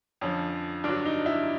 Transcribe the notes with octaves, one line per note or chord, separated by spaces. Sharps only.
F2 D3 F3 C#4
G2 D3 F#3 D4
D#4
E4